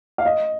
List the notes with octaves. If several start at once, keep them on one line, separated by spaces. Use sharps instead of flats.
F5
D#5